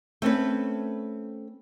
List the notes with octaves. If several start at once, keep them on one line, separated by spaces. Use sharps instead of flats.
A3 C4 C#4 B4